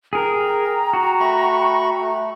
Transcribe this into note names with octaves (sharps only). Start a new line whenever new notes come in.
G#4 A#4 G5 A#5
F#4
A3 B5 C#6
A3